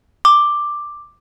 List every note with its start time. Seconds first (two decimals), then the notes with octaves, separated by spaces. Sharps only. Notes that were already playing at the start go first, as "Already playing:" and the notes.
0.25 D6